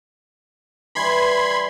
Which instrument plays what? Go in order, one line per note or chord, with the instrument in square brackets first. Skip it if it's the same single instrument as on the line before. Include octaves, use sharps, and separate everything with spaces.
[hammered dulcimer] E3 G3 E4 [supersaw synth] B5 C6 G#6